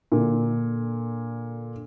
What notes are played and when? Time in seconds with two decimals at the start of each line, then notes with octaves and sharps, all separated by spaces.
0.12 A#2 D3